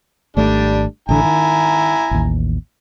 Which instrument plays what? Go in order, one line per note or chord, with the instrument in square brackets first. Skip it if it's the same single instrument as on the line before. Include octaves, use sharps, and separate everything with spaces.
[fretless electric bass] G#1 A3 [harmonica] G3 D4
[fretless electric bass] A1 D3 [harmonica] E4 G#5 A#5
[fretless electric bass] D#3
A1 D#2